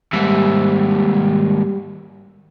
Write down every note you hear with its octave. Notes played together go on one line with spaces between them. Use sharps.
D#2 G#2 G3 E5